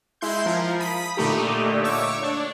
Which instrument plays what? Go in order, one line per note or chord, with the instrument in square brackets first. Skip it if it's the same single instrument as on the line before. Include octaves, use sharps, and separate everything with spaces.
[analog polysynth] G#3 E4 C6 G6
F3 A#4
B5 D#6 B6
A#2 D3 A3 D#4 G4
C#5 C#6 D6 E6
D4